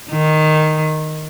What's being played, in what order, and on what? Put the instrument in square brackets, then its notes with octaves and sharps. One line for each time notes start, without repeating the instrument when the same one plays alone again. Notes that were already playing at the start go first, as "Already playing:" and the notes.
[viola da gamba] D#3